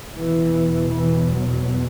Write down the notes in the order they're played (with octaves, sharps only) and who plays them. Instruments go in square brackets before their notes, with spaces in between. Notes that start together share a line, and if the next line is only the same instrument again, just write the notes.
[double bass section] E2 B2 E3
E3
F#3